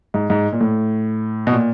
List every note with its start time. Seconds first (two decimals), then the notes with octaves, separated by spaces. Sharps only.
0.14 G#2
0.30 G#2
0.53 A#2
0.61 A2
1.47 B2
1.52 A#2